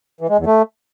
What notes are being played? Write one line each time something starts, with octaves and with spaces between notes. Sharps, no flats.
E3
G#3
E2
A3